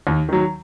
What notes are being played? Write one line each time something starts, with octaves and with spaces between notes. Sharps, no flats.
D#2
D#3 F#3